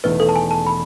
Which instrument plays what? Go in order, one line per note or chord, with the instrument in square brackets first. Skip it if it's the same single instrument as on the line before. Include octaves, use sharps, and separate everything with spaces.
[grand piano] E1 E2 D#3 A3 E4 [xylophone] B4
[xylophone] A4
A5
G#5
A5
B5